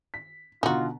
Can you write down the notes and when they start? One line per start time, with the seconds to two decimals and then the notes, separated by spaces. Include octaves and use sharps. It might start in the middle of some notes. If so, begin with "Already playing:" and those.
0.14 B6
0.63 B2 D3 D#4 F4 F#4 A#5